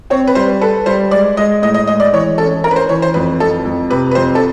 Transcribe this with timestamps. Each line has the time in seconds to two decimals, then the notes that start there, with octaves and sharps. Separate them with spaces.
0.10 C4 C#5
0.28 B4
0.35 G3 C5
0.61 A4 B4
0.86 G3 C5
1.11 G#3 D5
1.37 G#3 D#5
1.62 A2 D#5
1.74 D#5
1.88 G#3 D#5
2.00 D5
2.13 E3 C#5
2.38 C#4 A4
2.64 C#4 A#4
2.71 B4
2.76 C5
2.89 E3 C#5
3.02 C5
3.14 F2 B4
3.40 F2 A4
3.65 F2
3.90 C3 B4
4.11 B4
4.15 F2 C5
4.35 A4